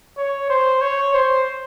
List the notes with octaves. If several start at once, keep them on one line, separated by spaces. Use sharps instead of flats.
C#5
C5
C#5
C5